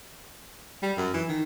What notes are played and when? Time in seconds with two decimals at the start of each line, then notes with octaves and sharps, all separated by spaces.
0.83 G3
0.97 F#2
1.14 E3
1.29 D#3